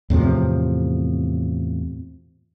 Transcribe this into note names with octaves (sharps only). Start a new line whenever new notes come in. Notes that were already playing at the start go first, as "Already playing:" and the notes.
E2 A2 C3 F3